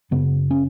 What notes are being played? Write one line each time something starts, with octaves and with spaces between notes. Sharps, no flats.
F#2 C#3 B3
C#4